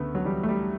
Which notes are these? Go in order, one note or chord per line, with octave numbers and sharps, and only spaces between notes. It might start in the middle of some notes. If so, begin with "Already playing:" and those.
Already playing: D2 C#3 A3 B3
F#3
E3 G3
A3
G3